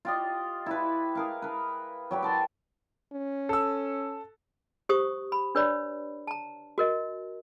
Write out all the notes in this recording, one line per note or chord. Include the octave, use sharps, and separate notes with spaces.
F4 G4 D#5
E4 B4
G#4 A#4 F5
A#4 B4
F#3 G4 B5
G5 A5 C6
C#4
A4 E6
G4 C5 C#6 D#6
B5
D4 B4 C#5 D5 B5
A5 A#5
F#4 A#4 D#5